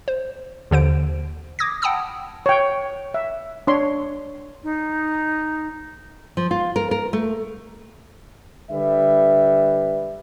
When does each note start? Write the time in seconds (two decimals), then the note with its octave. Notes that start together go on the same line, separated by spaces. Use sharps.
0.08 C5
0.71 D#2 D3 C5 D7
1.59 D6 D#6 G#6 A#6
1.82 F#5 G5 A5 B5 D#6 E6
2.46 C#5 G5
3.14 E5
3.67 D4 C#5 C6
4.64 D#4
6.37 F3
6.51 F4
6.76 A#4
6.91 A#4
7.13 A3
8.70 D3 G3 B4 E5